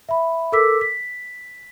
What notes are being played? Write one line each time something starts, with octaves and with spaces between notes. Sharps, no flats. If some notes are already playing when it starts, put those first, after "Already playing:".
E5 B5
A4 A#4 D6 E6 B6
B6